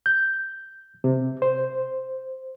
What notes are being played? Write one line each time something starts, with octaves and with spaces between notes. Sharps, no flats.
G6
C3
C5